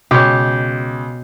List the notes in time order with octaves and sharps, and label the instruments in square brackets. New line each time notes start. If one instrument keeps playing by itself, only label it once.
[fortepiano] C#2 [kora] B2 C#5 [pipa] G4